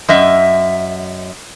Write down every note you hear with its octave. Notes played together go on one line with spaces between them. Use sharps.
F#2 D#5 E5